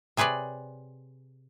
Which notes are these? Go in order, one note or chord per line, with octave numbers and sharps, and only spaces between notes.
C3 G#4 B4 C#5 D5